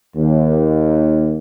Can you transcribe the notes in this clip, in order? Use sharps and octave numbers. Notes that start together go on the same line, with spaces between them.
D#2